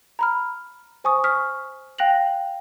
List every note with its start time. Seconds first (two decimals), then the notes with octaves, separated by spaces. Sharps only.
0.19 A#5 B5 F6
1.04 C5 G#5 C#6 D#6
1.24 C#6 D#6 F6 B6
1.98 F5 G5 F#6 A#6 F7 F#7